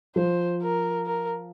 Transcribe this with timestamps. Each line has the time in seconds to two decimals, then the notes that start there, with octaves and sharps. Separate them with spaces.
0.16 F3 C5
0.62 A#4
1.06 A#4